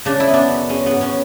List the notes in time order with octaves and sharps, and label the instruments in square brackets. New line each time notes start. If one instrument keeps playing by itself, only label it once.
[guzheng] C#3 D4
E4
B3
D4
F#2
G#3 C#4
G#2 B3
C#4